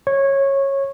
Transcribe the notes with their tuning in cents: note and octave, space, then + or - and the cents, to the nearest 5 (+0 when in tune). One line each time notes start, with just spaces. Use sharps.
C#5 -15